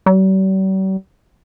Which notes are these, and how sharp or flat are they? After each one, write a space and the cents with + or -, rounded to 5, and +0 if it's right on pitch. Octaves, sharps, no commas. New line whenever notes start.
G3 -45